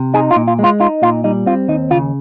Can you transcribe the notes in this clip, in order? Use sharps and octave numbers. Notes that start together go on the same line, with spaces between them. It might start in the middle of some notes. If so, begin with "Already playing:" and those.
Already playing: C3
D#4 G#4
F4
A#2
F4
G#3
F4
D#4 F4
A#2 F4
G3 D#4
C4 F4
D#2 D#4
C#3 F4